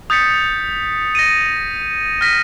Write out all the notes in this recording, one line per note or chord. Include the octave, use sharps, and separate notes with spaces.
D#6 G6 A6 B6 C#7
A#6 C#7 D#7
F6 A#6 B6 D#7